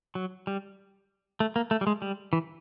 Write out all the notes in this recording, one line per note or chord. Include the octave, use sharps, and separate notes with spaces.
F#3
G3
A3
A#3
A3
G3
G#3
G3
E3